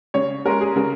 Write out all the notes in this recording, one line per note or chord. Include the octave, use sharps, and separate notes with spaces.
C#3 C#5
G#3 C#4 A#4
G#4
C#3 A#4